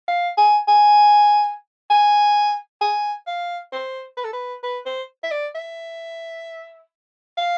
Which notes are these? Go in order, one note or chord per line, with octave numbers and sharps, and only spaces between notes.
F5
G#5
G#5
G#5
G#5
F5
C5
B4
A4
B4
B4
C5
E5
D5
E5
F5